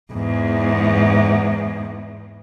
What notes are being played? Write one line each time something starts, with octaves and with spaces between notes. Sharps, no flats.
E2 G#2